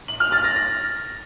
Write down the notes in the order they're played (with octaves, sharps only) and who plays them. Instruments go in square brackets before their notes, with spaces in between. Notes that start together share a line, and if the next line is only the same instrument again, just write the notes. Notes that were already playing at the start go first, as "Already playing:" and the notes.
[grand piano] F#7
F6
A6
A#6
A#6